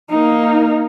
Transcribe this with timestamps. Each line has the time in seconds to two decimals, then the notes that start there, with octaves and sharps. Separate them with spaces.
0.11 A#3 D#4